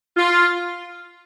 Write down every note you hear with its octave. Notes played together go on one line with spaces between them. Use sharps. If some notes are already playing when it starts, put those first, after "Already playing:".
F4